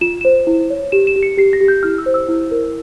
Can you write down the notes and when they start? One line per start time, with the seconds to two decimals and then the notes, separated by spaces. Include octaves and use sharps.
0.01 F4 E7
0.21 C5 E7
0.47 E4
0.70 C#5
0.92 G4 E7
1.07 E7
1.16 G4
1.23 C#7
1.37 G4 C7
1.53 A#6
1.60 G4
1.68 G6
1.83 E4 F6
1.98 E6
2.06 C5
2.14 E6
2.28 E4
2.52 A#4